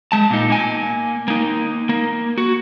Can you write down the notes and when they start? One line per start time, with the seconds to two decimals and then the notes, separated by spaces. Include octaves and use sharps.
0.12 G#3 A5
0.31 A#2 D#4
0.50 A#3 G#5
1.28 A#3 D#4
1.89 A#3
2.38 F#4